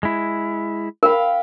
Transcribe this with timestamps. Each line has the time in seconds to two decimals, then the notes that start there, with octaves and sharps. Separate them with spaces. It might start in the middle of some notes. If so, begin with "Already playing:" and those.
0.03 G#3 E4
1.03 A#4 F5 G5 B5